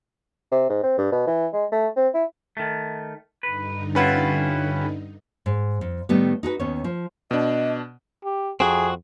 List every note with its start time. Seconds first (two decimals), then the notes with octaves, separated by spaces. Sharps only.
0.52 C3
0.69 G#2
0.83 C4
0.98 G2
1.12 B2
1.27 E3
1.53 G#3
1.72 A3
1.96 C4
2.14 E4
2.57 D#3 A3
3.43 G2 D3 D#4 B4
3.95 G3 C#4 E4 F4 B4 F#5
5.46 G#2
5.81 F2
6.09 A2 D#3 G3 A3 B3
6.43 D#4 F#4 G#4 B4
6.60 D#2 D#3 B3 C#4 C#5
6.84 F3
7.31 B2 D4 D#5
8.24 G4
8.60 F2 C4 F#4 G#4